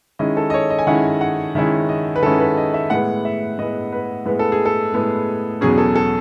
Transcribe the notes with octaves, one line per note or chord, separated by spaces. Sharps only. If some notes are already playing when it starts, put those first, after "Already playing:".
D#3 G#3 C#4 E4 D#5
A4
D#5
C#5
D#5
G#5
D#3 G#3 C#4 E4 F#5
F#5
D#3 G#3 C#4 E4 E5
D#5
B4
D#3 G#3 C#4 E4 A4
B4
D#5
E5
A2 G#3 B3 F#5
E5
A2 G#3 B3 D#5
B4
A2 G#3 B3 B4
A4
G#4
A4
A2 G#3 B3
E2 B2 F#3 C#4 G#4
A4
A4